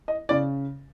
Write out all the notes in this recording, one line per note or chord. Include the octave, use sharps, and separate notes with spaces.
D#5
C#3 D5